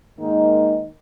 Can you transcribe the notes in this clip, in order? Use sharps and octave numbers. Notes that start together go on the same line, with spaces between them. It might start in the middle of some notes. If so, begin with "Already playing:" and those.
G#2 D#3 A#3 D#4